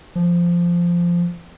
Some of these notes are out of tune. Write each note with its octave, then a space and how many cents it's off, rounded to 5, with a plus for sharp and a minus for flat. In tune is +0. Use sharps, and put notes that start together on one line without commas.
F3 -10